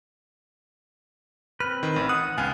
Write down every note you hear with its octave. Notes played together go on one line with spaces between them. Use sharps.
C4 B4 F6
D#3
A1
F#5 D#6
C#2 B3 F5 G#5